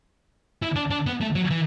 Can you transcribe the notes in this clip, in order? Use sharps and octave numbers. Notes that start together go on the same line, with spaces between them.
E4
D4
D4
B3
A3
F#3
E3